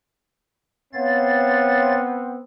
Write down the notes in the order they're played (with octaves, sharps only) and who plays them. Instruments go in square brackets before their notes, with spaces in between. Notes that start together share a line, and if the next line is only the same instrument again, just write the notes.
[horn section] B3 C4 [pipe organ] C#5 F5 A6